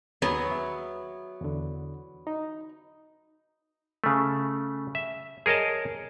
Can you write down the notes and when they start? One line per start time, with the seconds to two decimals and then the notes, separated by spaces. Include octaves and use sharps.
0.22 D#2 F#3 B3 G#4 C#5 A#5
0.51 E5
1.41 E2 D3
2.27 D#4
4.04 C#3 A3
4.95 E5
5.46 G#4 A#4 C#5 D#5 A5